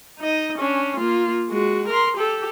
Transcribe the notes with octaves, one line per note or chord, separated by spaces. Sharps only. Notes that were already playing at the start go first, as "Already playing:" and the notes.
D#4 D#5
C#4 D4
A#3 F4
G#3 F#4
A#4 C6
G4 A4